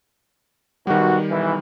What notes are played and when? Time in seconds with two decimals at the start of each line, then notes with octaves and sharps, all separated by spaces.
0.87 B1 D#3 G3 F#4
1.28 B1 E3